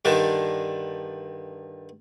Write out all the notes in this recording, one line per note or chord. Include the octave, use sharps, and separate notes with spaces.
G2 D3 D#3